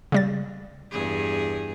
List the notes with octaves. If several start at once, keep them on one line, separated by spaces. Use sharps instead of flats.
C#3 G3 A6
E2 G2 G#4